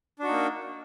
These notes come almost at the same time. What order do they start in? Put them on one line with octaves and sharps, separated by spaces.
D4 F#4 D#4 A#3